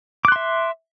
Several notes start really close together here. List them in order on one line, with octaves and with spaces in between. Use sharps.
D6 F#6 C6 E5